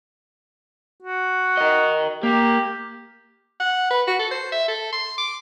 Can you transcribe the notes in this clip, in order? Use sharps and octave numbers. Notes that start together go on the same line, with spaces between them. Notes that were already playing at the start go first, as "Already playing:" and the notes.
F#4
A#4 D#5
A#3 G4
F#5
B4
F#4
A4
C5
E5
A4
C6
D6